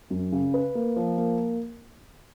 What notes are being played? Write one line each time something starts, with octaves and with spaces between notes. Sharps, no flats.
F#2
C#3
B4
A#3
F3
A#3